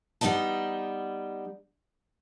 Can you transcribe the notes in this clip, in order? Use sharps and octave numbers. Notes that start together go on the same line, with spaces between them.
G3 B3 D#4 D#5 A5